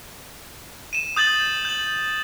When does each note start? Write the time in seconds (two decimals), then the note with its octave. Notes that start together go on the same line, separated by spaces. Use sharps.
0.93 D#7 E7
1.16 D#6 G6 A6 F#7
1.65 G6 F#7